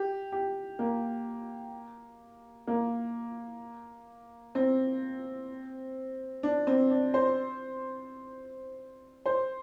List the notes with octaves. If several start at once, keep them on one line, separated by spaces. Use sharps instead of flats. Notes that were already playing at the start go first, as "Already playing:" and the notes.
Already playing: G4
G4
A#3
A#3
C4
D4
C4
D4
C5
C5